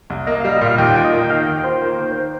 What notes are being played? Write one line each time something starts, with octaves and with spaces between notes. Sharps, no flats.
C2
A#3 D#5
F5
G3
D#5
A#2 F5
D#2 G5
F4
D#5
A#3
G5
D#3 F5
D#2 G5
F4 C5
A#3
D#3